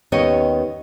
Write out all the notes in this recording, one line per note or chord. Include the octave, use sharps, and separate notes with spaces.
D#2 D#3 B3 C#4 C#5 D#5